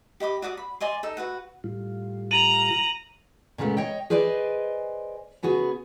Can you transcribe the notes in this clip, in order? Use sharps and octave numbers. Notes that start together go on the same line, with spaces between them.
G4 D#5 B5 D6
F#4 D5 D6 D#6
B5
D5 D#5 G#5 C6
D#4 A4
F#4 B4 F#5
A2 G3 F4
A#5 D#7 F#7
A#2 C#3 G#3 A3 B3
C#5 D#5 G5
G#4 B4 C5 D5 D#5 G#5
C#3 B3 F#4 G#4